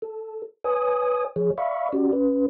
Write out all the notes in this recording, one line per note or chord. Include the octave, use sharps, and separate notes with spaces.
A4
B4 C#5 G#5 D#6
F3 G#4 C#5
D5 E5 F5 B5 C#6
C#4 F#4 G4 D5
C#4 B4